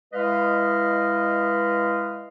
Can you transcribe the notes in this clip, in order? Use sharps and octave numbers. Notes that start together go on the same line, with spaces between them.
G#3 E4 B4 D#5 F5